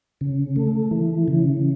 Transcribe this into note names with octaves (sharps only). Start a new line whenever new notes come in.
C#3
A3
E3
C#3